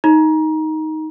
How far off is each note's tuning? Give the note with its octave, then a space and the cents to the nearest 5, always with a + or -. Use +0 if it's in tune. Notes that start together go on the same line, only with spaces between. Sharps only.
D#4 +10 A#5 +25